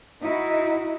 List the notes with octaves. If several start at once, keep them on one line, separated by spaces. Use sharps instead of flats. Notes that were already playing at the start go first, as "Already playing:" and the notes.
D#4 E4 F#4